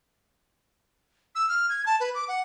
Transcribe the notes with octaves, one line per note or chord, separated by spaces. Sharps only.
E6
F6
G#6
A5
B4
D6
F#5